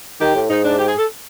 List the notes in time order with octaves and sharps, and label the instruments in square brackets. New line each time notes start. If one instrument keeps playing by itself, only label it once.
[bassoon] D#3 [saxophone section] G4
[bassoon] A2
[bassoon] G#2 [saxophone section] D#4
[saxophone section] D4
G4
G#4
A4